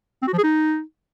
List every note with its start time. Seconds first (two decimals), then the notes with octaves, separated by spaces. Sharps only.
0.22 C4
0.28 F#4
0.33 F3
0.38 G#4
0.44 D#4